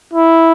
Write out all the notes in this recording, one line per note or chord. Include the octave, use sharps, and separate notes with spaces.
E4